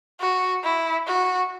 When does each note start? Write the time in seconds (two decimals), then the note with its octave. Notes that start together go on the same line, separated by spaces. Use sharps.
0.20 F#4
0.63 E4
1.07 F#4